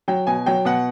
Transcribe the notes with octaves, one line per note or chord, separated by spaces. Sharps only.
F#3 G5
B2 G#5
F#3 G5
B2 F#5